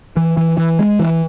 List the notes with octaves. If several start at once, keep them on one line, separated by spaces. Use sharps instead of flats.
E3
E3
E3
G#3
E3